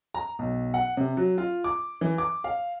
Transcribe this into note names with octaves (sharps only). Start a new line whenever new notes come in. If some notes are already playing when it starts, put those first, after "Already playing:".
A#5
B1
F#5
C3
F#3
F4
D6
E3
D6
F5